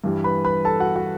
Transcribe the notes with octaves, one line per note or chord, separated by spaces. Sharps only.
G2 E3 G3
B4 B5
B4 B5
A4 A5
F#4 F#5
F#4 F#5